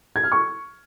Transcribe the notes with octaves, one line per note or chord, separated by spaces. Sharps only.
G#6
F6
C#6